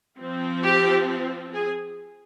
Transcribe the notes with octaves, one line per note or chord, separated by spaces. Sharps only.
F3 C4
G4
G#4